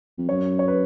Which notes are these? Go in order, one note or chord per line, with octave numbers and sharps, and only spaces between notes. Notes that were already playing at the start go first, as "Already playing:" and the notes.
F2
F#2 C#5
C#5
B4